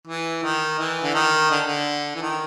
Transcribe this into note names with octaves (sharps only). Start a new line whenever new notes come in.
E3
D#3
E3
D3
D#3
D3
D3
E3
D#3